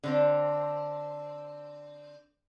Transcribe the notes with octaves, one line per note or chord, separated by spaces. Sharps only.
D3 C4 D4